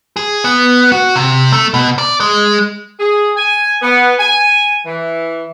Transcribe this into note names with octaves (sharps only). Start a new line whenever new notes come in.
G#4
B3
F#4
C3
A3
B2
D5
G#3
G#4
G#5
B3
G#5
E3